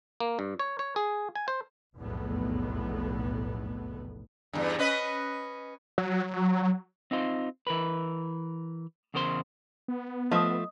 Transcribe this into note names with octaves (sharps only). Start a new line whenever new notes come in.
A#3
G2
C#5
C#5
G#4
G#5
C5
F1 B1 E2 A2 B3
E2 G2
C#4 B4 D#5
F#3
C4 D#4 F4 B4 C5
E3 A#4 B4
E2 C#3 A#4 C5 C6
B3
F3 A3 D#5 D#6